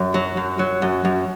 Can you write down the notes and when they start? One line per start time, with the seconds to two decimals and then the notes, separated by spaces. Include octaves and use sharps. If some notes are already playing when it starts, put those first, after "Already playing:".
Already playing: F#2
0.14 F#3
0.37 F#2
0.59 F#3
0.82 F#2
1.05 F#2